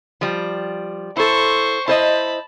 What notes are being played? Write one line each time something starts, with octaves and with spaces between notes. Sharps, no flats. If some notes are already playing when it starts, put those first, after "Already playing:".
F3 G3
E4 A4 C5 C#6
E4 C5 D#5 A5 B5